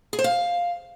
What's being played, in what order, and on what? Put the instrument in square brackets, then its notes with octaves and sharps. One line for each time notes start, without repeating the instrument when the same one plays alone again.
[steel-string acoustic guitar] G#4
C5
F5